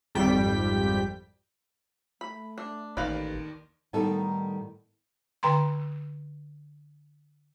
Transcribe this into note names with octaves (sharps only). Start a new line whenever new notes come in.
G#1 F2 G3 G5 B6
A3 B5
D4
A1 D#2 D#3 B4 D5 F5
A2 D#3 G3 B3 D#4 A4
D3 G5 A#5 C6